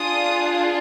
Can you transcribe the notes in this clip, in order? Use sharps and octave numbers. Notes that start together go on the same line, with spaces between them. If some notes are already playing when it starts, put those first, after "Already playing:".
Already playing: D4 F4 G#4 D#6